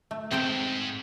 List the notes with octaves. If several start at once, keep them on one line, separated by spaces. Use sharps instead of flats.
A3
C#2 G#2 C4 C5 G5